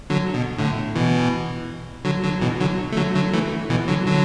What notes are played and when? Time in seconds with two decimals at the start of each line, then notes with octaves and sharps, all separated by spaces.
0.10 D3 F#3
0.34 B2
0.58 A2 D3
0.95 B2 E3
2.05 D3 F#3
2.23 D3 F#3
2.41 B2 E3
2.60 D3 F#3
2.92 A3
2.97 D3 F#3
3.15 D3 F#3
3.33 E3 A3
3.70 B2 E3
3.88 D3 F#3
4.06 D3 F#3